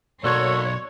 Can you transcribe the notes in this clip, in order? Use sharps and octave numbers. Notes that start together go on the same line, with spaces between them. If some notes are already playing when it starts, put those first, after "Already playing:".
B1 A#3 F#4 A4 C#5 D5 C6 G#6